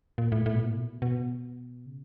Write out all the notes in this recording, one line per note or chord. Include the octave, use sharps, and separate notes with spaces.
A#2
A2
A2
B2
A#2
B2
B2
C#3